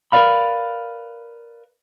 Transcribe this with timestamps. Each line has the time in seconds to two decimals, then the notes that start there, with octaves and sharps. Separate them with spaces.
0.12 A#4 B4 C#5 D5 F5 B5